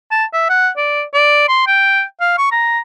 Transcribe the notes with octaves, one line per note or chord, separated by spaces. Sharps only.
A5
E5
F#5
D5
D5
C6
G5
F5
C#6
A#5